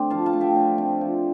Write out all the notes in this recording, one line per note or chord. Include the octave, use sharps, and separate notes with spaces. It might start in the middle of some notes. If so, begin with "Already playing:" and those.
Already playing: D3 A3 C4 D5
F3 F5 A5
F5 A5
A3
E5 G5
D3
C4
F3